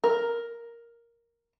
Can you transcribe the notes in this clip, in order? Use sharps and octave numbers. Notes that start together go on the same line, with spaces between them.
A#4